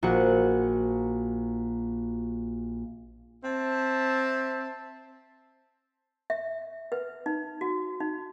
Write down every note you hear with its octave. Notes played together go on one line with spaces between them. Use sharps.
A#1 F#4 F#5
C4 E5 A5
E5
B4
D#4
F#4
D#4